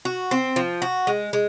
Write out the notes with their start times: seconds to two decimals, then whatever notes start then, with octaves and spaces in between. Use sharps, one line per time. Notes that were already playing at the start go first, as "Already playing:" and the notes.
0.05 F#4
0.31 C4
0.56 F3
0.82 F#4
1.07 G#3
1.33 G#3